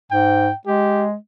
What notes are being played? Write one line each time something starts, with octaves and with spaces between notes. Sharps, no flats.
G#2 G5
G#3 G4